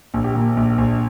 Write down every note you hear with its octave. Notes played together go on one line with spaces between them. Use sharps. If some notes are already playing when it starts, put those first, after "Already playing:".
A#1
G4
A#2
A#1
A#1